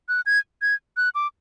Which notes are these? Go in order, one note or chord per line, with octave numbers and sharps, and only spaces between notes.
F#6
G#6
G#6
F#6
D6